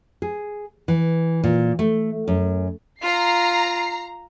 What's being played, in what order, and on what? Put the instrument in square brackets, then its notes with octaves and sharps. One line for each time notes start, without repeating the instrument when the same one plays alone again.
[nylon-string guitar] G#4
E3
A#2
A3
F#2
[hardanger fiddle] F4 [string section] A#5 C7